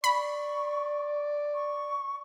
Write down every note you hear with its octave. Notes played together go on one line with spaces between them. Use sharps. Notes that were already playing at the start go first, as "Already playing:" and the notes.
D5 B5 C#6
C#6